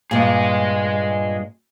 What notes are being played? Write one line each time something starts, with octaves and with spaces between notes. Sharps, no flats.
G2 A#2 G#4 D#5